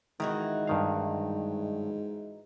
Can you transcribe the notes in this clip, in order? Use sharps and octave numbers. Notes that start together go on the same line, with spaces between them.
G#2 D#3 E3 D#4 F#4
G2 D#3 F5